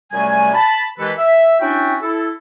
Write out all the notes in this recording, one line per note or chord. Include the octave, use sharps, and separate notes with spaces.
F#2 C3 G3 A3 G#5
A5 B5
D#3 E3 G#3 G4 A4 B4
E5
C#4 D4 E4 F#4 E5 G5
E4 A4